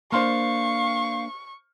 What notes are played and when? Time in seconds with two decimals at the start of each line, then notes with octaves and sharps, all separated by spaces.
0.12 A#3 D4 C5 F5 C6 C#6 F6